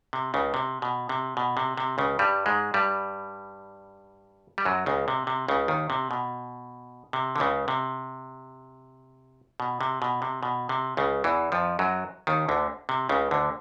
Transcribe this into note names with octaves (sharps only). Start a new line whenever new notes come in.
C3
C#2 C#3
C3
B2
C3
B2
C3
C3
C#2 C#3
G2 G3
G#2 G#3
G2 G3
G3
F#2 F#3
C#2 C#3
C3
C3
C#2 C#3
D#2 D#3
C3
B2
C3
D3
C#2 C#3
C3
B2
C3
B2
C3
B2
C3
C#2 C#3
E2 E3
F2 F3
F#2 F#3
D#2 D#3
D2 D3
C3
C#2 C#3
D2 D3